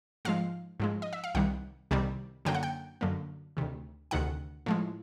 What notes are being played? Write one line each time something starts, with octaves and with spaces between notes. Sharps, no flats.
G#2 F3 G#3 F5
G#2 F3 G#3
D#5
E5
F5
C2 C3 D#3 G3 F#5
C2 C3 D#3 G3
F#2 D3 F#3 A#3 G5
F#5
G5
F#2 D3 F#3 A#3
D2 C3 D#3
D2 C3 D#3 F#5
A2 F3 G#3